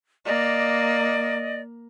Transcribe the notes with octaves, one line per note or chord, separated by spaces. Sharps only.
A#3 D5 D#5